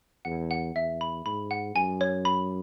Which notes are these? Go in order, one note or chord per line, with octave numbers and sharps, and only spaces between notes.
E2 F#5
F#5
E2 E5
B5
G#2 B5
F#5
F#2 G#5
C#5
B5